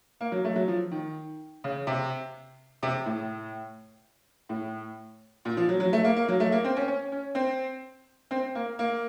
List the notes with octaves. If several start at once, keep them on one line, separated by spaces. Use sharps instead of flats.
A#3
F#3
A3
F#3
F3
D#3
C#3
C3
C3
A2
A2
A#2
F3
F#3
F#3
A3
A#3
A#3
F#3
A3
A#3
C4
C#4
C#4
C#4
C4
C4
A#3
A#3